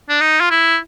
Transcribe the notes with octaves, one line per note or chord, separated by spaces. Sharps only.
D4
D#4
F4
E4